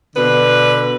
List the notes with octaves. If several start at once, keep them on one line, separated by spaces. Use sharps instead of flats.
B2 D3 B4